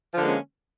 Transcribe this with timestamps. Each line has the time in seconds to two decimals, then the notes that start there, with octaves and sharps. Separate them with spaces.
0.14 F3
0.17 D3
0.21 A#3
0.24 G#3
0.27 C#4